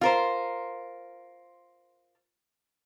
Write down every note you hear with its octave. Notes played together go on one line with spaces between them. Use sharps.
F4 A#4 C5